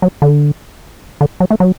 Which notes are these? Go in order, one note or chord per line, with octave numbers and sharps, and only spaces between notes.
F#3
D3
D3
F#3
A3
F#3